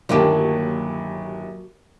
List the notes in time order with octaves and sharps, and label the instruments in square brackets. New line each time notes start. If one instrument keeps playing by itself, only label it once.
[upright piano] G1 D#2 A5 [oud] F#3 A#3 G4